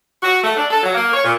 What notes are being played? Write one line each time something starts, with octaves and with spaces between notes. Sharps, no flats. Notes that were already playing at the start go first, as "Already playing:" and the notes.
F#4
A3
D4
A4
F#3
A#3
C#5
A#2